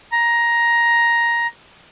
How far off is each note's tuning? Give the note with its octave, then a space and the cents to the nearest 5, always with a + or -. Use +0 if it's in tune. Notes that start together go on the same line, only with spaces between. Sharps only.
A#5 +10